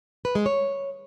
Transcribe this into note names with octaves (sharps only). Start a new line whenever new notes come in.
B4
G#3
C#5